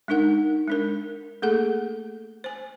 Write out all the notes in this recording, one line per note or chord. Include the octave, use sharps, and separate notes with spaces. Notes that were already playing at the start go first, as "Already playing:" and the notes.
G#3 D4 D#4 A#4 F#5
G#3 D4 A#4
A3 A#3 G#4 A4 F#5
C5 G#5